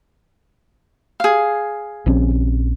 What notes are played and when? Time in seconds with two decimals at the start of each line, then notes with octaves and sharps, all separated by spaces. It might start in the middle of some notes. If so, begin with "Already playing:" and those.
1.20 G#4 F5
2.06 A#1 C4 C#4